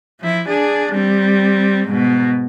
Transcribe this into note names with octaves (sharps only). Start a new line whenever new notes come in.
F3 E4
D4 G#4
G3 C4
G#2 B2